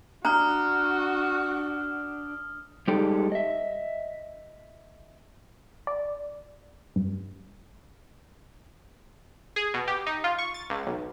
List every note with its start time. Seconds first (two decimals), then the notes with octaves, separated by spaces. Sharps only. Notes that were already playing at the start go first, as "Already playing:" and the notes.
0.25 D4 F#4 A#5 D#6 F6
2.88 G3 G#3 D#4 G4 A4 G5
3.32 D#5 E5
5.87 D5
6.96 G2
9.56 G#4
9.74 B2
9.88 G4
10.07 D#4
10.24 F4
10.38 C#6
10.54 A6
10.70 C#2
10.87 B1